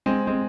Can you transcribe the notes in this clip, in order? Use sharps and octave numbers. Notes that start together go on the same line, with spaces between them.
G#3 C4
G#3 C4